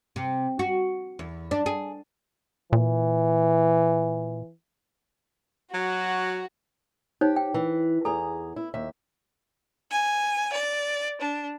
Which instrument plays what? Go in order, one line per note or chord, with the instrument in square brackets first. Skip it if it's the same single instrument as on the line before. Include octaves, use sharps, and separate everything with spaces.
[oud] C3
F#4
E2
D4
G#4
[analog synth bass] A#2 [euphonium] E3
[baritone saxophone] F#3 [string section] F#4
[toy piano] D#4 C5 C#5 [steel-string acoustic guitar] G4
[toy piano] G5
[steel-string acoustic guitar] E3
[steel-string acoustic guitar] E2 G#4 A#5 [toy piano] A4
[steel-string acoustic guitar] E4
D#2 E5
[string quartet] G#5
D5
D4